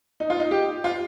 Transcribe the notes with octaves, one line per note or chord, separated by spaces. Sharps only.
D#4
F4
D#4
G4
F4